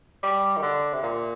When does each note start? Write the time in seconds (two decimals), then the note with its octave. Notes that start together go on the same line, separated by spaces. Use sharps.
0.23 G3
0.57 D#3
0.63 D3
0.94 C3
1.03 A#2